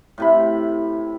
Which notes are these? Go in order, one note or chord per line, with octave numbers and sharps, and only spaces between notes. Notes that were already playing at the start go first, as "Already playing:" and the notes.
A2 C3 B5